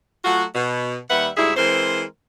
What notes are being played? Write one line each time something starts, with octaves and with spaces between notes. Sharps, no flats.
F#3 A3 F4 F#4
B2
D#2 G3 B4 E5 F#5
D2 G#2 G3 E4 G#4 E5
E3 G#3 C4 A#4 C5